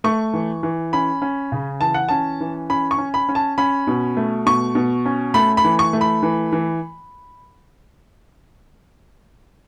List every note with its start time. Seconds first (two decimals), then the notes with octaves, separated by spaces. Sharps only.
0.04 A3 C#6
0.33 E3
0.63 E3
0.93 C#4 B5
1.22 C#4
1.52 C#3
1.81 E3 A5
1.94 F#5
2.09 C#4 A5
2.41 E3
2.70 C#4 B5
2.91 C#6
2.98 C#4
3.14 B5
3.29 C#4
3.35 A5
3.58 C#4 B5
3.87 B2
4.17 A3
4.46 B2 C#6
4.75 B2
5.05 C#4
5.34 A3 B5
5.57 B5
5.64 E3
5.79 C#6
5.93 A3
6.01 B5
6.23 E3
6.52 E3